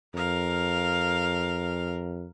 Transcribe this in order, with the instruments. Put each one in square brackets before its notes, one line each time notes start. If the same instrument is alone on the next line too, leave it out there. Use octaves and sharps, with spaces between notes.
[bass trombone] F2 [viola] A#4 F5